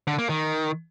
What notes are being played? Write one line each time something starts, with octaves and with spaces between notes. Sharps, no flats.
D3
A#3
D#3